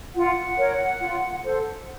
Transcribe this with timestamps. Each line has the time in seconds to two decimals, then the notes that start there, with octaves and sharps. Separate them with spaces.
0.15 F4 F#5
0.57 A#4 C#5
1.00 F4
1.44 A4 C5